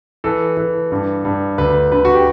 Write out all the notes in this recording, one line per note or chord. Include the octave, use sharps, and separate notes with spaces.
E3 A4
E3
G2
G2
D2 B4
D3 B4
F#4
G4